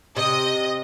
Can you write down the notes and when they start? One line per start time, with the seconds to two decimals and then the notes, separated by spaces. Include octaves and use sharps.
0.16 C3 D#5